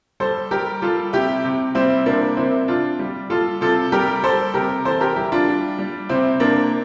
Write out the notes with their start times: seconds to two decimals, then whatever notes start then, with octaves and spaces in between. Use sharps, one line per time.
0.20 G3 A4 C5
0.51 G3 G4 A#4
0.82 G3 F4 A4
1.13 C3 E4 G4
1.44 C3
1.75 G3 C4 E4
2.06 C3 A#3 D4
2.37 C3 C4 E4
2.68 C3 D4 F4
2.99 G3
3.30 G3 F4 A4
3.61 C3 F4 A4
3.92 G3 G4 A#4
4.23 G3 A4 C5
4.54 C3 G4 A#4
4.85 E3 A4 C5
5.01 G4 A#4
5.16 G3 E4 G4
5.32 D4 F4
5.48 G3
5.79 G3
6.09 C3 C4 E4
6.40 C3 A#3 D4